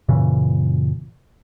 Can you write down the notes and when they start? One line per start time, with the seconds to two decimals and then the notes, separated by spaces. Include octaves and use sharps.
0.09 F#2 A#2 C#3 E3